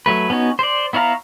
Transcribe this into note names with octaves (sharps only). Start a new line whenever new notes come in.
F#3 A3 B4
B3 C#4 D#4 F#4
C5 D5
B3 E4 C#5 F5 A#5